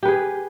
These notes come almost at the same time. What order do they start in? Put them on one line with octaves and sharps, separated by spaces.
G4 B4 G#4